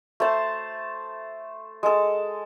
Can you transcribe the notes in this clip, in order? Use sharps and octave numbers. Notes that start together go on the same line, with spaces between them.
A3 C5 A5
G#3 A4